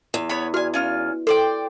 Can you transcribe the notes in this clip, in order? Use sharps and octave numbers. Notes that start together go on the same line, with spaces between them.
E2
B3 C#5 B5
F#4 D5 G#5 F6
C#4 F4 F6
A4 C5 D5 G5